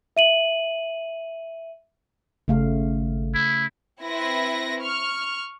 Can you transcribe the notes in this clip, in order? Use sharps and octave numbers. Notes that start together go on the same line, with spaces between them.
E5 D#7 F#7
G#1 C#3 A3 F5
E4
C4 E4 B4 A#6
C#6 F6